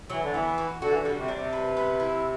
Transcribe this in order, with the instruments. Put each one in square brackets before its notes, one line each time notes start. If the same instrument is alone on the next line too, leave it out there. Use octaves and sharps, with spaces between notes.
[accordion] E3 [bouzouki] F#3
[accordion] D3
[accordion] E3 [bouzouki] B3
[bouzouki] F#4
[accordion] D3 [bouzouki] F#4
[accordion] E3
D3
[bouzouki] G3
[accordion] C3
[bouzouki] D4
[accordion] C3
[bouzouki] B4
B3
E4